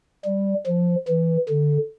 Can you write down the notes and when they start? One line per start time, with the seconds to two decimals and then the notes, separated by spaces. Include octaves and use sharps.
0.26 G3
0.67 F3
1.08 E3
1.49 D3